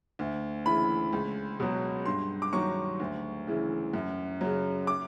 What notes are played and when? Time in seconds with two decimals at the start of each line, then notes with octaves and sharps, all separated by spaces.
0.19 D2
0.66 C#3 E3 B5
1.13 C#2
1.60 B2 F#3
2.06 G2 C6
2.42 D6
2.53 D#3 F#3 C#6
3.00 D2
3.47 C#3 E3
3.94 F#2
4.41 C#3 F#3
4.87 D6